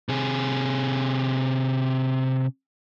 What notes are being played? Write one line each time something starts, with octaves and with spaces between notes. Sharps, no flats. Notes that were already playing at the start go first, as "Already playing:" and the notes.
C3 G#4